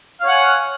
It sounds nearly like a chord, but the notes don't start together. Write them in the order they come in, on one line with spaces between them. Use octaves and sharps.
F5 C#5 F#5 G#5